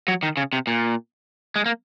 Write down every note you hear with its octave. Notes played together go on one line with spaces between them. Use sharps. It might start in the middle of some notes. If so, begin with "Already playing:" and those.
F#3
D#3
C#3
C3
A#2
G#3
A#3